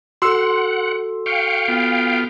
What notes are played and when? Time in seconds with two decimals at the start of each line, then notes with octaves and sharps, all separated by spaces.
0.22 F#4 A4 F#5 C6 E6
1.26 F5 G5 C#6
1.68 B3 F4